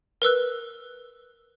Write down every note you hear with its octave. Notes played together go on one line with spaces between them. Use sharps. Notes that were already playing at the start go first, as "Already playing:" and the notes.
A#4 B4 E6 F#6